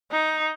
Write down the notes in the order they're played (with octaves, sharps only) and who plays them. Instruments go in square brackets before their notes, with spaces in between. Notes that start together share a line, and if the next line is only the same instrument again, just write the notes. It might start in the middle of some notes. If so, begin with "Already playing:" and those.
[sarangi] D#4